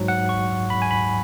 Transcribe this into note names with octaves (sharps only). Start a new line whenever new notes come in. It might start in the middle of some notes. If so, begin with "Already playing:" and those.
Already playing: G#2 F#3
F#5
C#6
B5
G#5
B5